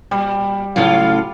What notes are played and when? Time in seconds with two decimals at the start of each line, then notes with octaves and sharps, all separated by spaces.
0.11 A#2 G3
0.76 A2 C#3 F#3 A3 F4 F5